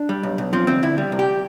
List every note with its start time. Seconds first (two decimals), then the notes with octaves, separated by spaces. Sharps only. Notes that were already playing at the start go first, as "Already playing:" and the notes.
Already playing: D4
0.09 G3
0.23 B1
0.38 B1
0.53 F3 C4
0.67 D2 C4
0.83 D2 E4
0.98 G3
1.12 C2
1.19 G4